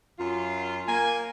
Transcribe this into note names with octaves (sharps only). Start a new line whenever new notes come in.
F#2 F4
A#3 G#5